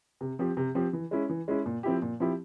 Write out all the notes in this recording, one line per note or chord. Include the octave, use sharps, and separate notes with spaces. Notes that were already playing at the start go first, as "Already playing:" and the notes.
C3
F3 C4 G4
C3
F3 C4 G4
E3
G#3 C#4 E4
E3
G#3 C#4 E4
A#2
F3 C4 E4 G4
A#2
F3 C4 E4 G4